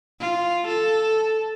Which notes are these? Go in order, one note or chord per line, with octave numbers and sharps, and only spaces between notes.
F4
A4